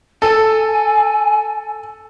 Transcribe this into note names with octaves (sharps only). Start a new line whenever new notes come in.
A4 G#5